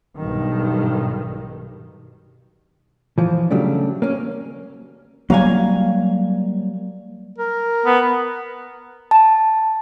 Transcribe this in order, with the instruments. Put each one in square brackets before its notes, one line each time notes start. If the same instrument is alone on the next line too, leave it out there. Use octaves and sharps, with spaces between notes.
[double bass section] B1 G2 D#3
[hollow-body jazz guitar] E3 F3
C#3 F#3 G3 A3 D4
A#3 C#4
[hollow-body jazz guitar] F#3 F5 G#5 [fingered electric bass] G3 A#3
[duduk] A#4
[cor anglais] B3
[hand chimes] A5